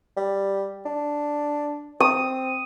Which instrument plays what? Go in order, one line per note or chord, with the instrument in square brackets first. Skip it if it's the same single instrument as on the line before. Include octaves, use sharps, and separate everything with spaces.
[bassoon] G3
D4
[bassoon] C4 [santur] D#6